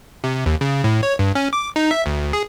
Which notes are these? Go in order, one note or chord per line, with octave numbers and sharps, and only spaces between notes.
C3
D#2
C#3
A2
C#5
G2
C#4
D6
D#4
E5
D2
G#4